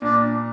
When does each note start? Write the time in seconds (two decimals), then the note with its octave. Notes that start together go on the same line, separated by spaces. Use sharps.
0.02 A#2 D4